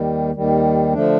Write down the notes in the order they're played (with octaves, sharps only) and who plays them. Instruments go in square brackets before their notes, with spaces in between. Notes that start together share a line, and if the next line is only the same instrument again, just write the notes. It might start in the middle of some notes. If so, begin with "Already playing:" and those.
Already playing: [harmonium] D#2 D#3 G3
D#2 D#3 G3
D3 F3 A3 D4